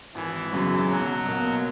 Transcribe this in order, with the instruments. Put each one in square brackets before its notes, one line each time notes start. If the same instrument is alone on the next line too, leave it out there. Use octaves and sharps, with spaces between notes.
[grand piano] G#1 [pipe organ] E3
[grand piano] F#2 C#3 F#3 C#4
[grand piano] B1 [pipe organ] F#3
[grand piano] B2 A#3